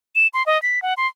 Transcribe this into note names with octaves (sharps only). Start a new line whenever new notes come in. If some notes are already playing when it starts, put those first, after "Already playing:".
E7
C6
D#5
B6
F#5
C6